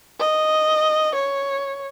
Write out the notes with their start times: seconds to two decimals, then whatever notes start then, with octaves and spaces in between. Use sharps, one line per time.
0.19 D#5
1.15 C#5